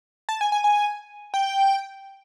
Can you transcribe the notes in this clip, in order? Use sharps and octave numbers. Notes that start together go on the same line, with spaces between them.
A5
G#5
G#5
G#5
G5